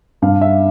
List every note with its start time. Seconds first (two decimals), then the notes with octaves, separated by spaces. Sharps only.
0.22 G2 F5
0.41 E5